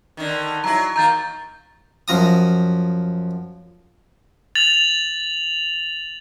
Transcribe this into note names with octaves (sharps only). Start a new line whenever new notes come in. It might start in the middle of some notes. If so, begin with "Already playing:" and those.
D3 D#3
F#3 E4 A#5
D#3 A#3 A#5 G6 A6
F#2 F3 A#5 D#6
A6 F7 F#7